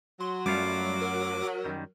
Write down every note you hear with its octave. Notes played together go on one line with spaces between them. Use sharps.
F#3 C6
F#2 G3 A3 F4 D6
A#4
F#2 D#3 G3